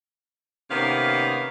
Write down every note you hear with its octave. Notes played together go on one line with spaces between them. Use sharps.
C3 D#3 A#3 B3 C#4 F5